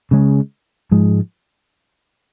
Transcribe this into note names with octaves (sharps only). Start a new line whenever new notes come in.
C#3 G#3 C#4
G#2 F3 G#3